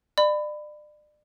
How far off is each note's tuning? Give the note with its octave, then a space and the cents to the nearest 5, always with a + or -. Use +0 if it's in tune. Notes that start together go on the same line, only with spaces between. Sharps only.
D5 +35 B5 +20